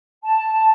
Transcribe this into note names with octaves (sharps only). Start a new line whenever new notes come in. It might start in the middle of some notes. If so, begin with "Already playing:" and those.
A5